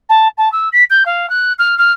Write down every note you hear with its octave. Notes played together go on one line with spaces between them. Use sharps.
A5
A5
E6
B6
G6
F5
F#6
F6
F6